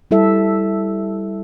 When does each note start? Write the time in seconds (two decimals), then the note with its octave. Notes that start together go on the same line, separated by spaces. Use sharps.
0.11 G3 E4 A4 E5